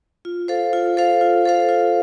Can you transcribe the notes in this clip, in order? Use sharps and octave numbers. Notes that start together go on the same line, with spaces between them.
F4
A4 C5 F5
F4
A4 C5 F5
F4
A4 C5 F5
F4